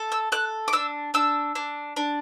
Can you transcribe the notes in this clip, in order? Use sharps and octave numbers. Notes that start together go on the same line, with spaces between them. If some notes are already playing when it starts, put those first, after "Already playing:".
Already playing: A4
E6
A4 F#6
D6
D4 E6
D4 E6
D4
D4